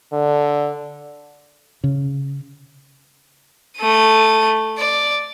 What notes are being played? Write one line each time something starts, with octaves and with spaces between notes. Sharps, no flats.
D3
C#3
A3 D#7
D5